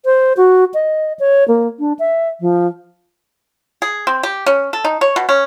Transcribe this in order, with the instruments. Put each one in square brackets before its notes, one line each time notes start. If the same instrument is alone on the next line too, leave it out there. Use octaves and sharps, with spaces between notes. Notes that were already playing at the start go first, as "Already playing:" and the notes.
[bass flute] C5
F#4
D#5
C#5
A#3
D4
E5
F3
[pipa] G#4
C4
G4
C#4
A4
D#4
C#5
B2
C#4